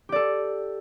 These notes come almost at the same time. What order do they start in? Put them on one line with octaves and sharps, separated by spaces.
G4 D5 A4